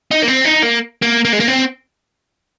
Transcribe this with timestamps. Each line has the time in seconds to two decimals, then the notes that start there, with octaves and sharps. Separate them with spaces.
0.11 D#4
0.22 A#3
0.28 C4
0.45 D#4
0.63 A#3
1.02 A#3
1.25 A#3
1.33 G#3
1.40 A#3
1.48 C4